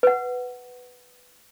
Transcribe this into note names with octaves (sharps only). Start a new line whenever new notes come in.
B4 F#5